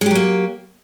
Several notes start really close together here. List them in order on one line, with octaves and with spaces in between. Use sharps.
G#3 G4 F#3 A#3